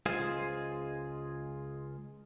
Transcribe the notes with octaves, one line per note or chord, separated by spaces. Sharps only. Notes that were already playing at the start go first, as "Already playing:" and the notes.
C#2 G#3 F4 G#4 C5